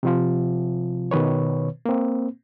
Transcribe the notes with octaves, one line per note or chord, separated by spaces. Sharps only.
C3 F3 F4
B2 D#3 B4 C#5
A#3 C4